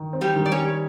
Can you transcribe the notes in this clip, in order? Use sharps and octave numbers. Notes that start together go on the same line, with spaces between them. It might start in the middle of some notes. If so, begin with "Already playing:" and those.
Already playing: D#3
C4
G3 G4
D#3
D5
C#4 C#5
G3